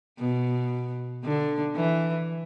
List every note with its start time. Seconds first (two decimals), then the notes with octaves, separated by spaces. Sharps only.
0.19 B2
1.24 D3
1.76 E3